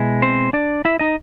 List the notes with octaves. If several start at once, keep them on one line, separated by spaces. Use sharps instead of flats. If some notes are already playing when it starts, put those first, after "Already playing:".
Already playing: B2 G#3 E4
C4 C5
D4 D5
E4 E5
D#4 D#5